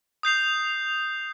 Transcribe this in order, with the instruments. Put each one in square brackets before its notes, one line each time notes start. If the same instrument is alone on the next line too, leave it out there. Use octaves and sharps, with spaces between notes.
[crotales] D#6 G6 C7 F7